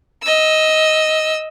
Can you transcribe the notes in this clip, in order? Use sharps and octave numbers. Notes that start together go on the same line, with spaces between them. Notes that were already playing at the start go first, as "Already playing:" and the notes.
D#5 E6